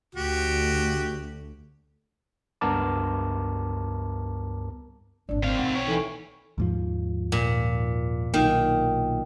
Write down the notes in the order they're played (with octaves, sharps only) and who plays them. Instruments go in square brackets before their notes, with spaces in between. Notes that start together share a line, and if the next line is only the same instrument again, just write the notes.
[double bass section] D2 [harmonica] F#4 G4
[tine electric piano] C#2 G2 B3 A#4 A5 D6
[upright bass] G#1 A#2 [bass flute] D4 [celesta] D5
[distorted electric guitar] D#3 F5 [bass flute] C4
[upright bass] B1 [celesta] F#5
[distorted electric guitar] G4 C#5
[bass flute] E3 [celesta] D#4 A4
[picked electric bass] D#2 G#2 F3
[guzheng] A#2
[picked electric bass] B1 A#2 [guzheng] D#3